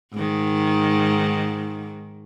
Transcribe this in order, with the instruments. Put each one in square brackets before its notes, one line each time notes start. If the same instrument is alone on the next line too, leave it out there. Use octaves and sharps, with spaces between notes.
[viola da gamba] G#2 D#3